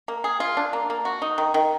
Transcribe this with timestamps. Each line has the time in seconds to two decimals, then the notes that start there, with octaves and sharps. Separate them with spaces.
0.08 A#3
0.24 G#4
0.40 F4
0.57 D4
0.73 A#3
0.90 A#3
1.05 F#4
1.22 D#4
1.38 D#3
1.54 D#3